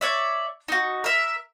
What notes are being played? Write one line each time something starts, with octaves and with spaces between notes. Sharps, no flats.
C#5 D5 E5
D#4 F#4
A#4 E5